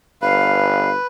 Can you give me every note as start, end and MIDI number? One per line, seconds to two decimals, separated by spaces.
0.22 0.95 31
0.22 1.07 71
0.22 0.90 77